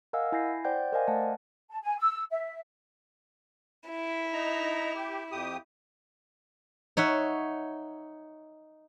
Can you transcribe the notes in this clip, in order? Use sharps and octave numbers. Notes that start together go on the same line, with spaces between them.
A#4 D#5 F5 F#5 G#5 E6
E4 G#5 G6 A#6 C7
C5 D5 F#5 G5 G6
A#4 C5 D5 D#5 F5 G#5
A3 F#5 A5
A5
G#5
E6
E5
E4
D#4 A#5
G4
F2 G4 D#6
D#4 C#5 E5 F#5